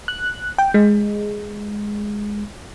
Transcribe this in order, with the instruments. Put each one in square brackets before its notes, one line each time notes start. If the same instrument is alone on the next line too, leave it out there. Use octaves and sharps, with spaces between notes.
[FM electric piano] F#6
G5
G#3